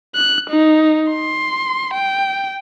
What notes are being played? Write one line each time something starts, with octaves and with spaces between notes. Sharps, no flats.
F#6
D#4
C6
G5